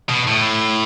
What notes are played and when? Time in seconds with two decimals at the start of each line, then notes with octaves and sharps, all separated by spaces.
0.09 B2
0.27 A2